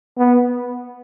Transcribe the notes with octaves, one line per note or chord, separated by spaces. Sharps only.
B3